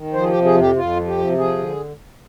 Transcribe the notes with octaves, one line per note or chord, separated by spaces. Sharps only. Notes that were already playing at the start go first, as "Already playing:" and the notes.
Already playing: D#3
F3 C5
G#4
G4
C3
G#4
F2
G4
F2 F4
F3
G4
C3
F3 G#4
D3